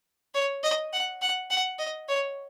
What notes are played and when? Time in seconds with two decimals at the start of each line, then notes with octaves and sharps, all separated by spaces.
0.34 C#5
0.63 D#5
0.93 F#5
1.22 F#5
1.50 F#5
1.79 D#5
2.09 C#5